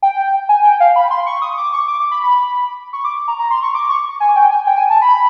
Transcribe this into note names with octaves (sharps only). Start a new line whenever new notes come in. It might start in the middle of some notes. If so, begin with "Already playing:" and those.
G5
G#5
G5
F5
B5
C6
C#6
D#6
D6
C#6
D6
D6
B5
B5
C#6
D6
A#5
A#5
C6
C#6
D6
C#6
G#5
G5
G#5
G5
G#5
A5
B5